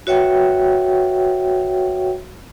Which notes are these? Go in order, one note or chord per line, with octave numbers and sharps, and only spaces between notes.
F#4 B4 C#5 E5 F#5 G5